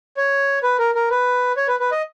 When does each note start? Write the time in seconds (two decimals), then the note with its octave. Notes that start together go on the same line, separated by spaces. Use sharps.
0.17 C#5
0.63 B4
0.78 A#4
0.95 A#4
1.10 B4
1.57 C#5
1.68 B4
1.80 B4
1.92 D#5